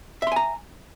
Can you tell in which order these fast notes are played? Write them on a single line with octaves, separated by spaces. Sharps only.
E5 C6 G#5 A#5